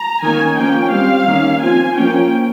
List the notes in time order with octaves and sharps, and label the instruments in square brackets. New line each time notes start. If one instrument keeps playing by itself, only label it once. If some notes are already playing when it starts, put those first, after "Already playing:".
Already playing: [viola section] A#5
D#3 A#3 C#4 G#5
F3 A#3 C#4 G5
G3 C4 F5
D#3 A#3 C#4
F3 C4 G#5
F3 A#3 C#4 G5